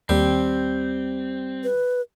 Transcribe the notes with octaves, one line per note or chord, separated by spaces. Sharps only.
D#2 G3 C4
B4